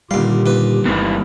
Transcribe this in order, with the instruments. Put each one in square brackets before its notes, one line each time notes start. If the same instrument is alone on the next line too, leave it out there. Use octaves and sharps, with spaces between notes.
[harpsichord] D#2 F5 [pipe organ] A#2 F4 G4 [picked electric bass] D3 G3
[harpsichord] D#2 B4
[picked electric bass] G1 G3 B3 [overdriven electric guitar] G#2 E3